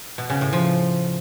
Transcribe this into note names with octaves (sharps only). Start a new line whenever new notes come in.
B2
C#3
A2
F3